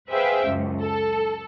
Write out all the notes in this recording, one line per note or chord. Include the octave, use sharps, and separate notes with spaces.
G#4 B4 C5 E5 F5 G5
C#2 F#2
A4